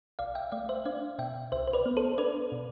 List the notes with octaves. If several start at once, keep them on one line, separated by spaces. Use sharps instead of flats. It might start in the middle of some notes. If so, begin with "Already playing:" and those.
B1 D5 F5
E5 G5
A3 D5 F5
C5 E5
D4 D5 F5
B2 E5 G5
C2 C5 E5
C5
B4 D5
B3
A4 C5
D4 B4 D5
B2